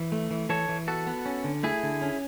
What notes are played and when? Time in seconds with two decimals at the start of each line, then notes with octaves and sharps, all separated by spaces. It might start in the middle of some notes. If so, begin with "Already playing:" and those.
Already playing: E3
0.12 A3
0.31 E3
0.49 E3 A4 C#5
0.69 E3
0.87 B3 F#4 A4
1.07 B3
1.26 C#4
1.44 D3
1.63 A3 E4 G#4
1.83 D3
2.02 C#4